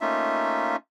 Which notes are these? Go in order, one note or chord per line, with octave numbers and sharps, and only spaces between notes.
A3 A#3 C#4 D#4 F4 E5